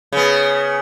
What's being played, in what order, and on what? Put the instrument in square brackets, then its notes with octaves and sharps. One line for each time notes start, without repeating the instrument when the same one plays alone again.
[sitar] C#3 B3